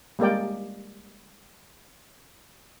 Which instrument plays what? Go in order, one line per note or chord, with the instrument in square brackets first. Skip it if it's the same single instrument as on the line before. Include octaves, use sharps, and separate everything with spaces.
[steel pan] G3 G#3 A#3 A#4 D5 G5